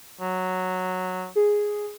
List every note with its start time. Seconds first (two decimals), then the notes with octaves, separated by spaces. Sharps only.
0.21 F#3
1.36 G#4